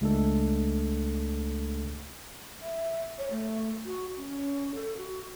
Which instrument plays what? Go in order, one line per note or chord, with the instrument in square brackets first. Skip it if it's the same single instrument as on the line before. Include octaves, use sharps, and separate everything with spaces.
[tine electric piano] C#2 G#3 A3 D4 A4
[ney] E5
C#5
A3
F#4
C#4
A4
F#4